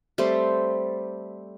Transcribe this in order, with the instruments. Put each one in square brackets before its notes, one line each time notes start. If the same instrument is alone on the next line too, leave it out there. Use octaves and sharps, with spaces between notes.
[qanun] G3 A3 C4 C5